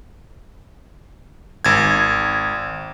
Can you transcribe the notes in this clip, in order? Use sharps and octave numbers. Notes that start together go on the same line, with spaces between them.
G#1 G#6